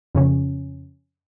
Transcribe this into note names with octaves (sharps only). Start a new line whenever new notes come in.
F2 C#3 C#4